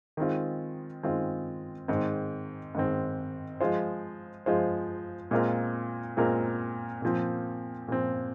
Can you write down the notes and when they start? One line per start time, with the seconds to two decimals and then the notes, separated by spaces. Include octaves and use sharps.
0.17 D#3 G#3 C4 F4
1.03 D#3 G#3 C4 F4
1.88 G#2 D#3 C4
2.75 G#2 D#3 C4
3.61 F3 G#3 F4 C5
4.46 F3 G#3 F4 C5
5.31 A#2 G#3 C4 F4 A#4
6.17 A#2 G#3 C4 F4 A#4
7.02 A#2 F3 C4
7.88 A#2 F3 C4